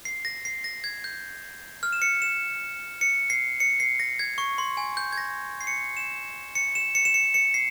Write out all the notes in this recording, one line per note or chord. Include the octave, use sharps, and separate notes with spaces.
C7
A#6
C7
A#6
G#6
G6
F6
E7
C#7
E7
C#7
C7
C#7
C7
A#6
G#6
C#6
C6
G#5
G6
G#6
A#6
C7
C#7
E7
C#7
E7
C#7
E7
C#7
C#7
C7